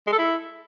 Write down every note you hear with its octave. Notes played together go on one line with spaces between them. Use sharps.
G#3
A4
E4